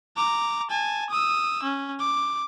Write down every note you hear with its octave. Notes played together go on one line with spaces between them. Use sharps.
A#5 D6
G#5 A5
D#6 E6
C#4
D6